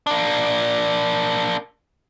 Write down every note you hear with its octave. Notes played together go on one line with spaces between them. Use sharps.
A#3 D4